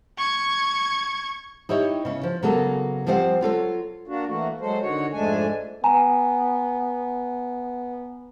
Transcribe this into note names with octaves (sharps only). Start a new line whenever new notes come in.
C#6 G#6
D#4 E4 G4 C#5
C#3 C#4
F3
C#3 F#3 A#3 B3 G#4 A4
F3 G3 C4 C5 F5 F#5
F#3 F4 A4 C#5
A#3 D4 F#4
E3 A3 A#3 F#4
F#3 G#3 A4 C5
D3 D#3 F#4 C#5
F2 G#2 G#3 A3 D4 G#5
B3 G#5 A#5